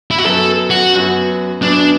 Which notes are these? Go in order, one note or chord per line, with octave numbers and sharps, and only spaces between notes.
E4
F#4
F#2 F#3 B3 A4
F#4
F#2 F#3 B3
F#2 F#3 B3 D4